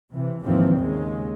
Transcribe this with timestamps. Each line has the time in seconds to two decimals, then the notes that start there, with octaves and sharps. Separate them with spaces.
0.11 C3 E3
0.42 G#1 D#2 G#2 E3 F3 C4
0.76 D#2 C#3 G#3